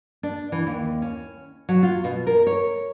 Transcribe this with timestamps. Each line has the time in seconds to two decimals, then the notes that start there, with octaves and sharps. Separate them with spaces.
0.23 D4
0.52 E3
0.67 D#2
1.02 C#4
1.69 F#3
1.83 F4
2.04 B2
2.27 A#4
2.47 C#5